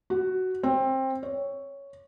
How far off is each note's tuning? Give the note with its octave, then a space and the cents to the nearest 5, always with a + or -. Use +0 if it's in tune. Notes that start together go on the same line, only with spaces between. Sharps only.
F#4 +10
C4 +20
C#5 +5